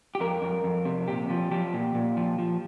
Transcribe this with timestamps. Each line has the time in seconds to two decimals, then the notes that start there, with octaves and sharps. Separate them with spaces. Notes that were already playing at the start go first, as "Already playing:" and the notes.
0.15 G4
0.20 F2 A#4
0.42 F2
0.64 F2
0.85 C3
1.08 A#2 G4
1.30 F3
1.51 F3 G4
1.74 A#2
1.95 A#2
2.17 F3
2.39 F3